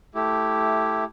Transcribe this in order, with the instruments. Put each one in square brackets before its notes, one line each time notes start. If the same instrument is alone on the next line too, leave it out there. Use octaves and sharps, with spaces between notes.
[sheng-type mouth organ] A3 E4 G4